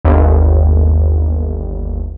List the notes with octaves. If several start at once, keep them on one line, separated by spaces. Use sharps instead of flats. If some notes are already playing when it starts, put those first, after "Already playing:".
G1 D#2